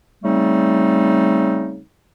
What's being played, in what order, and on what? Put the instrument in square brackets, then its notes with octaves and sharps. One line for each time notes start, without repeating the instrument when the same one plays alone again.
[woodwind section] C#3 G3 A3 C4 D#4